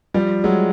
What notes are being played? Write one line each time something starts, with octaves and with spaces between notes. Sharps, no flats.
F3 G3
F#3 G#3